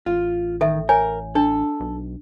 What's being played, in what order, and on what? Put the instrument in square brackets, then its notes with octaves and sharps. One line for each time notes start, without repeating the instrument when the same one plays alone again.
[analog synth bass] A1 [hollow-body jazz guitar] F4
[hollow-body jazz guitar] D#3 [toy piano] A4 E5
[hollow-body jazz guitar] A#4 [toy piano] C#5 G#5
[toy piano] D4 [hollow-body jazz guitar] A4
[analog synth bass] B1